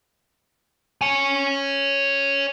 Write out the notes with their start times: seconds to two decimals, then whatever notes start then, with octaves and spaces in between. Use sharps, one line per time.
1.01 C#5 G#5